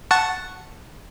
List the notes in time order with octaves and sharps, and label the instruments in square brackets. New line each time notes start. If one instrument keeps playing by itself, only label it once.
[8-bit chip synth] F#5 A5 C#6